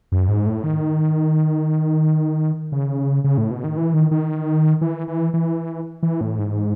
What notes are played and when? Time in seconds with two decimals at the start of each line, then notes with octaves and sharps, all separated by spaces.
0.12 F#2
0.28 G#2
0.46 A2
0.64 D#3
2.72 C#3
3.24 C#3
3.38 A2
3.51 B2
3.64 D#3
3.77 E3
3.94 D#3
4.11 D#3
4.81 E3
5.08 E3
5.34 E3
6.03 E3
6.21 A2
6.38 G#2